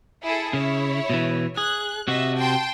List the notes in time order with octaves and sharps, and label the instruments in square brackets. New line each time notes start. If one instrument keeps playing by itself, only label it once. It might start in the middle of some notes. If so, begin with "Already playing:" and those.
[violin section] E4 G#4 A4
[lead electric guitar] C#3 [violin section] E4 C#5
[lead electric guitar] B2 E3
[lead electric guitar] G#4 [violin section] F#6
[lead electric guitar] C3 F#4 [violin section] D#5 E5
[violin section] G5 A5 C6